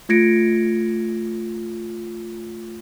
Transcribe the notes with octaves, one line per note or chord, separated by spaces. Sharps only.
A3 F4 G#6 A#6 C#7 D7